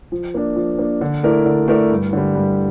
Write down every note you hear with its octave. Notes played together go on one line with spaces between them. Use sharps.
F3
A#3 D4
F3
A#3 D4
D3
A3 E4 A#4 D5
D3
A3 E4 A#4 D5
G2
D3 G3
G2